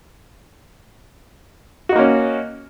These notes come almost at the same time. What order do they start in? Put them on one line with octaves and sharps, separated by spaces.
F#4 D#4 A#3 C#4